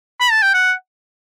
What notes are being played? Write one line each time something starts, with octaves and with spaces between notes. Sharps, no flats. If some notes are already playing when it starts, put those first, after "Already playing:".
B5
A5
G5
F#5